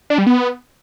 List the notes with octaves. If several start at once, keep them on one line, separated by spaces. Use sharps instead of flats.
D4
G3
B3